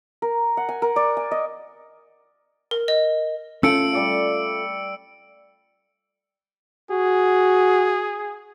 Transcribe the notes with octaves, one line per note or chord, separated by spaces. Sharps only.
A#4
F#5
G#5
A#4
D5
G#5
D#5
A#4
D#5
A3 C#4 F4 A4 E6 C#7 D7
G3 D5 F5
F#4 G#4